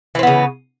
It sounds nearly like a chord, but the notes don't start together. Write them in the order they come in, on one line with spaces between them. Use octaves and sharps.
E3 C4 B3 C#3